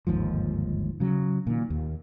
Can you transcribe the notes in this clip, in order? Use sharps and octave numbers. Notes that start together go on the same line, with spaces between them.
G1 D#2 G#2 F3
C#3 F#3
A#2 D#3
D#2